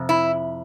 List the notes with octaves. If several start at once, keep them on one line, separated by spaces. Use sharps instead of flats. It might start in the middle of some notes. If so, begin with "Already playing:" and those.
Already playing: F2 C3
E4